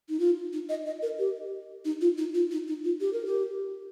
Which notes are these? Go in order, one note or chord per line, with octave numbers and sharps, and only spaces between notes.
D#4
F4
D#4
D#5
D#5
A#4
G4
D#4
F4
D#4
F4
D#4
D#4
F4
G4
A#4
G4